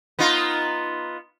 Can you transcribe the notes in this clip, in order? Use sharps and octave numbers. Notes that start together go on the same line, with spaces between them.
B3 D#4 F4